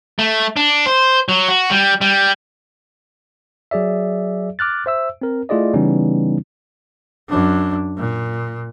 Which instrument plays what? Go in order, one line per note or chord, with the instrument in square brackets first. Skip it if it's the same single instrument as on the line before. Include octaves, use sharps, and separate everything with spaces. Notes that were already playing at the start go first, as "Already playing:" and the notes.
[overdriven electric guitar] A3
D4
C5
F#3
F#4
G3
G3
[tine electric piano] F#3 G#4 D5 E5
D6 F6 F#6 A6
C5 E5 E6
C4 A#4
A3 E4 F4 G#4 D5 D#5
C#3 E3 G3 B3 C#4 D#4
[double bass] F#2 D4
A#2